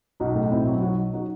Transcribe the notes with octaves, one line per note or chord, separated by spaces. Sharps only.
B1 D#4 F#4
A2
B1 C4 E4
F#3
B1 D#4 F#4
F#3
D#4 F#4